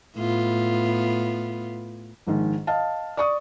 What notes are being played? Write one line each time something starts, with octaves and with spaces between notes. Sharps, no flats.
A2 B3 F4
A#1 G#2 D#3
D#5 F5 A5
D5 C#6 D#6